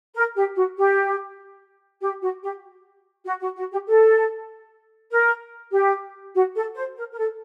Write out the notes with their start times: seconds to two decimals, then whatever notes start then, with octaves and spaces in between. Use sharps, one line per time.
0.15 A#4
0.36 G4
0.56 F#4
0.77 G4
2.01 G4
2.22 F#4
2.42 G4
3.25 F#4
3.40 F#4
3.56 F#4
3.72 G4
3.87 A4
5.11 A#4
5.73 G4
6.35 F#4
6.55 A4
6.76 C5
6.97 A#4
7.12 A#4
7.18 A4